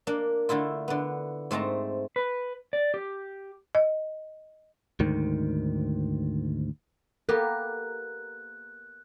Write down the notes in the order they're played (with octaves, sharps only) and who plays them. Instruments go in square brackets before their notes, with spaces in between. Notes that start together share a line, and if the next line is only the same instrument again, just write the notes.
[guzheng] A#3 D4
D3 A3 E4 F4
D3 B3
G#2 A3 C4 A5 A#5
[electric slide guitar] B4
D5
G4
[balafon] D#5
[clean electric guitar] D2 G#2 D#3
[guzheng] A#3 B3 G4 [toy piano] A4 [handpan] A#4 [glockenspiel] F#6